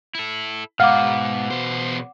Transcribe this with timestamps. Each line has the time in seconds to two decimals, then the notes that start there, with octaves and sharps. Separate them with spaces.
0.15 E4 A4
0.80 G#2 B2 F5 F#5 D6
1.51 E2 C5